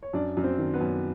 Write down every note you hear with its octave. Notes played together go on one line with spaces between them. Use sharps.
C#5
F#2 D4 D5
F#2
C4 C5
D#3
B3 B4
F#2